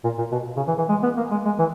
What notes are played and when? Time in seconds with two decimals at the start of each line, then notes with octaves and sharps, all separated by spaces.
0.04 A#2
0.18 A#2
0.32 B2
0.56 C#3
0.67 E3
0.78 E3
0.89 G#3
1.03 B3
1.17 A#3
1.31 G#3
1.45 G#3
1.59 E3